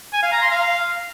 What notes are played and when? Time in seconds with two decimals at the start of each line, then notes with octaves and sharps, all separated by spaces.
0.13 G#5
0.23 F5
0.32 A#5
0.42 C6
0.51 F5